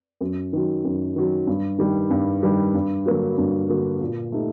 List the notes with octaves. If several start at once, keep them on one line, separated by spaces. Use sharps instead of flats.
F#2
D#3 F#3
F#2
D#3 F#3
G2
D#3 G3
G2
D#3 G3
G2
D3 F#3 A#3 F#4
G2
D3 F#3 A#3 F#4
A#2
A3 D#4 G4